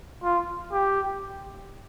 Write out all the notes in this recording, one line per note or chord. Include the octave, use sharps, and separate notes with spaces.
F4
G4